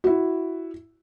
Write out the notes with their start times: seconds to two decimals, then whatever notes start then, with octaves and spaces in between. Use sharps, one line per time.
0.04 E4 F#4